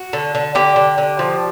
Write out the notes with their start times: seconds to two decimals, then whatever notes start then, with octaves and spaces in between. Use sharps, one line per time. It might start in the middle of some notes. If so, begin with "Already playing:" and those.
Already playing: F#4
0.13 D3
0.35 D3
0.55 D3 G4
0.76 D3
0.98 D3
1.19 F3